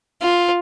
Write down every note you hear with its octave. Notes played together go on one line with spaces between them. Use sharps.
F4